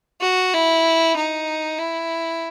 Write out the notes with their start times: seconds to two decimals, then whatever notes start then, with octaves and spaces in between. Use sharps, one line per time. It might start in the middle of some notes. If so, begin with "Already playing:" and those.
0.21 F#4
0.54 E4
1.16 D#4
1.79 E4